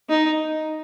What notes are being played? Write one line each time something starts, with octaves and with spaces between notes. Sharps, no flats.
D#4